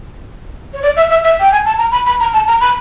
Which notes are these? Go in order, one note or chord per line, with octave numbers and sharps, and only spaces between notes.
C#5
D5
E5
E5
E5
G5
G#5
A5
A#5
B5
B5
A#5
A5
A#5
B5